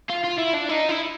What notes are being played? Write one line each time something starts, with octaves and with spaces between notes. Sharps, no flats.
F4
F4
E4
D4
D#4
E4